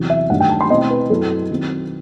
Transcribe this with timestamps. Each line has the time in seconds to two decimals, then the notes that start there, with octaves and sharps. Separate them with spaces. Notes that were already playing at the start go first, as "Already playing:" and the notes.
Already playing: E2 C3 F#3
0.10 E5
0.30 G2 D#3 F#3 A3 D#4 F#5
0.40 G5
0.49 A5
0.61 C6
0.70 B2 A3 C4 E4 D#5
0.90 B4
1.10 F#2 F#3 C4 E4 A4
1.50 D#3 F#3 C4